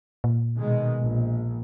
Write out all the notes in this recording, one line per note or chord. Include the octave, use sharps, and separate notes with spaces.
A#2
B2 D#3 G#3
A#1